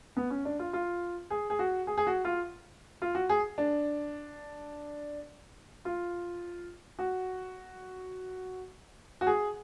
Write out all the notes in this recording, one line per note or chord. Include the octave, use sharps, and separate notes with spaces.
B3
C#4
D4
F4
F4
G#4
G#4
F#4
G#4
G#4
F#4
F4
F4
F#4
G#4
D4
F4
F#4
F#4
G#4